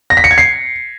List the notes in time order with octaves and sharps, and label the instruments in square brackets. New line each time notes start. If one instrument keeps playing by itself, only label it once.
[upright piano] A#6
B6
C#7
G#6
C7